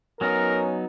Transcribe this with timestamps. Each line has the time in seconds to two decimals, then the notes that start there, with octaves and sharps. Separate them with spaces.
0.21 F#3 B3 C#4 D#4 A#4